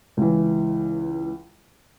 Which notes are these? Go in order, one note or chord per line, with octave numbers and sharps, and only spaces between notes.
C#2 E3